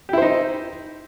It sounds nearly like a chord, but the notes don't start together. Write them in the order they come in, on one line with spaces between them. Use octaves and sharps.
G4 E4 C5 D#4